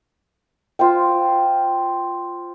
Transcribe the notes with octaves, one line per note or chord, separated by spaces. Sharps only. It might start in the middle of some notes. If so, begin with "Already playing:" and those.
F4 C5 G5